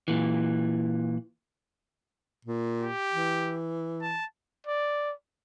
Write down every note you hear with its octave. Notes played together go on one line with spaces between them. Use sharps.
A#2 E3
A#2
G4
E3
A5
D5